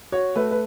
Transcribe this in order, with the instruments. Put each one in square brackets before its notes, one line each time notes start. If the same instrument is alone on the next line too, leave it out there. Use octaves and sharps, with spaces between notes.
[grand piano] F#4 [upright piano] C#5
[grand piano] A3 [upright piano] B4
[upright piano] B4